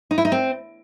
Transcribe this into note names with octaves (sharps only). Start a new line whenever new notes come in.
D#4
E4
D#4
C4